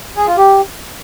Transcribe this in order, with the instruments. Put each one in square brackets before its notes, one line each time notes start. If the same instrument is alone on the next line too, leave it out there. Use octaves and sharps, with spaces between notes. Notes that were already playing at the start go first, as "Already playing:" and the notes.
[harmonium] G#4
F4
G4